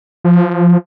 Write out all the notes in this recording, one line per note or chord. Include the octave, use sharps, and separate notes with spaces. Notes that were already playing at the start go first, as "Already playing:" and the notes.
F3